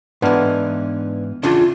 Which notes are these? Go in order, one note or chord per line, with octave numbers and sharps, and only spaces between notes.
G#2 E3 B3 D4 F6
E2 C#3 D4 F4